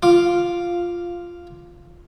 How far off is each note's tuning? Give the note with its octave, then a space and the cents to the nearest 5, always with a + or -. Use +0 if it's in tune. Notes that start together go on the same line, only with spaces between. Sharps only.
F4 -5 F5 +0 D6 +0